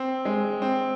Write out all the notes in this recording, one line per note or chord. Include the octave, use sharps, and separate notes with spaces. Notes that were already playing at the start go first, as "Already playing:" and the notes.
Already playing: C4
G#3
C4